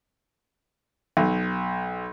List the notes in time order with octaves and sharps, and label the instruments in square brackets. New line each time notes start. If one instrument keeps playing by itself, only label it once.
[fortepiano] B1